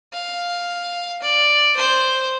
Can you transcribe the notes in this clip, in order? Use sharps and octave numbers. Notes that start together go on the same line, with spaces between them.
F5
D5
C5